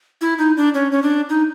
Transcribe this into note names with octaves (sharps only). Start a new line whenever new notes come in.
E4
D#4
D4
C#4
C#4
D4
D#4